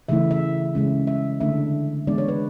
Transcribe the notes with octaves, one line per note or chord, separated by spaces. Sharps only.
C#3 E3 A3 E4 E5
E5
C#3 G#3 C#4
E5
D3 A3 D4 E5
E3 G#3 B3 D4 D5
C#5
B4